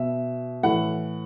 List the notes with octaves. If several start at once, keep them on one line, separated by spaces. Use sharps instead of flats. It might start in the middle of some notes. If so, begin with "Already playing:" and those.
Already playing: B2 E5
A2 E3 F#5